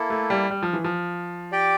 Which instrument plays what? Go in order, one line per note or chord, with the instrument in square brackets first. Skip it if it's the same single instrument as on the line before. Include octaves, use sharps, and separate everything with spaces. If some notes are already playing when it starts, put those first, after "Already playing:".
Already playing: [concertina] A#3 E4 A4
[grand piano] A3
G3
G3
F3
E3
F3
[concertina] G4 D5 G5